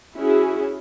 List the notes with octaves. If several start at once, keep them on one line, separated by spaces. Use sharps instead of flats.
C#4 E4 F#4 G#4